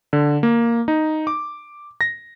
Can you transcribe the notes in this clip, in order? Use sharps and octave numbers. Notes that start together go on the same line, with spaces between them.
D3
A#3
D#4
D6
A#6